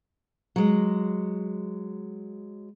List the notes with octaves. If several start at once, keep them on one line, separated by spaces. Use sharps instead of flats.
F#3 G#3